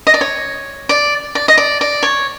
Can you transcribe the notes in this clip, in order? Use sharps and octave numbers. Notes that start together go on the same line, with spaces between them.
D#5
D5
C#5
D5
D5
D#5
D5
D5
C#5